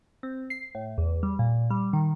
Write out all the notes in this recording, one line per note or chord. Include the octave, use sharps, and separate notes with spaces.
C4
C7
A2
E2
G3
A#2
G3
D#3